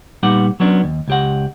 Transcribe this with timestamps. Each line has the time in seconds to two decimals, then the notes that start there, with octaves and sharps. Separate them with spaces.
0.23 A#2 G3 B3 D#4 G4 F#5
0.60 F#3 B3 C#4 D4
0.84 D#2
1.08 C#2 G4 F#5